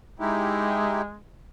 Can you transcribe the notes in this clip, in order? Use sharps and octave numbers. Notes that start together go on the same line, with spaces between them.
G#3 D#4 E4 G4